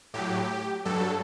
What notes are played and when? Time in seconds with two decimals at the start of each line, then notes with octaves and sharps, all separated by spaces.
0.14 A2 F#3 G4
0.85 G2 F#3 A4